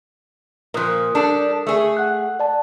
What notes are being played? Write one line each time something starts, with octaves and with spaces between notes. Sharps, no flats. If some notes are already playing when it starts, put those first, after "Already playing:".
A#2 F3 A#4 D#6 F#6
G3 D4 A4
A3 G#4
F#5 F#6
D5 A5